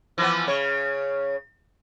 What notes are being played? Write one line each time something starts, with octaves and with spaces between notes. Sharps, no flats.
E3 F3 B3
C#3 C#5